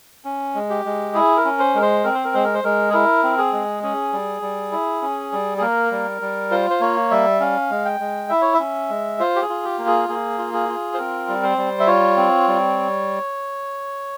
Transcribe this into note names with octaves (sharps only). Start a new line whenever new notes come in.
C#4
G#3
G4
G#3
E4 G#4
A#4
C#4
C5
G#3 A#4
C5
C4 A#4
C5
A#4
G#3 C5
A#4
C5
G#3 A#4
G#4
E4 A#4
C4
G#4
G#3
C#4 G#4
G3
G3
E4
C#4
G3
G#4
A#3 A#4
G3
G3
F4 C5
C5
A#3 C#5
G3 E5
C#4 F5
G#3
G5
G#3
E4 E5
C#5
E5
C#4
G#3
F4 C5
G4
G#4
F4
G4
A#3
G#4
A#3 G#4
F4
G#4
F4
C5
C4 A#4
G3
C5
G3
E5
F4 C#5
C4
G3